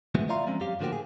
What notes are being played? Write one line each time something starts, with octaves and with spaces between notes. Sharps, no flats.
C3 E3 G#3 A3 B3 F#4
F4 D5 E5 F5 A#5 C6
F3 G#3 C4 C#4
F#2 G4 F5
A2 D3 F3 A#3 F#4 G4
G#4